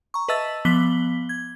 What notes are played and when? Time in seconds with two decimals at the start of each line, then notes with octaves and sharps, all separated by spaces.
0.14 A#5 C#6
0.29 B4 D#5 E5 A5 E6 A6
0.65 F3 B3 D6 B6 F#7 G7
1.29 G#6